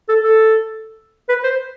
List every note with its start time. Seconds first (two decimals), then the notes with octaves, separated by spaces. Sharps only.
0.09 A4
0.24 A4
1.29 B4
1.44 C5